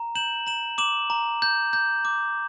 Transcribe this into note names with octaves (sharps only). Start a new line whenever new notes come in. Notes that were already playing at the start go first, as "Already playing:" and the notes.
Already playing: A#5
G6 E7 F#7
A#5 E7 F#7
D6 E7 F#7
A#5
G6
G6
D6